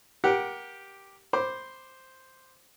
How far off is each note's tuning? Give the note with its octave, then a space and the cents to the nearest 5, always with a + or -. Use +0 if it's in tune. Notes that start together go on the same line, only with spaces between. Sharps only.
G4 +0 A#4 +25 F#5 +0
C5 +0 B5 +0 D6 +0